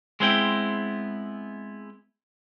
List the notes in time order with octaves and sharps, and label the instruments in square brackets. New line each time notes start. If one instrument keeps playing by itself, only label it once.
[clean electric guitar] G#3 B3 C4 E4 F5 G5